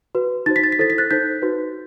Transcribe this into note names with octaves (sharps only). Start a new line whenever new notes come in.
F#4 B4
D#4 F#4 C5 A6
B6
A6
B6
E4 A4 C5 A6
B6
F#6 A6
D#4 A4 C5 G6 B6
D#4 F#4 B4